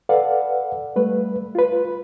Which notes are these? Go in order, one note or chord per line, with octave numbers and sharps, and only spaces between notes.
A4 B4 D5 F5 F#5
G3 A3 B4
F4 B4